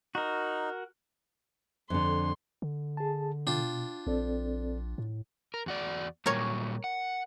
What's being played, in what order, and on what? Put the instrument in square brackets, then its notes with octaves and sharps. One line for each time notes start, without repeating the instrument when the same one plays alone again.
[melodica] D#4 [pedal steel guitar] F#4 A#4
[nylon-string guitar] F2 D3 [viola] C6
[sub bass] D3
[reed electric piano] G#4 A5
[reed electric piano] B2 [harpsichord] D4 F4 G5
[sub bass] A#1 [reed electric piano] C4 A4 D5
[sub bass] A2
[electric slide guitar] A#4
E2 F#4 D5
[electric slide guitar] A#2 F#3 G3 [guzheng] A#4 C#5
[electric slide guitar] F#5